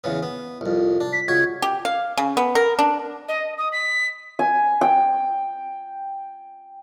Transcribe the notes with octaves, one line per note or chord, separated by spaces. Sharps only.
E2 C#3 B3
B3
C2 F2
D4
B6
C#2 F#4 C#6 G#6
G4
F5
C#3
B3
A#4
D4
D#5
D#6
B6
G#5
G5